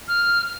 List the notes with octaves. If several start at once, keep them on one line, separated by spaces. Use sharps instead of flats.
F6